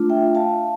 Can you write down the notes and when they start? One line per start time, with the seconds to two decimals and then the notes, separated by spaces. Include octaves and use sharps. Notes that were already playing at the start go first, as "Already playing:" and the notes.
Already playing: A3 D4 F4
0.10 E5 G5
0.35 F5 A5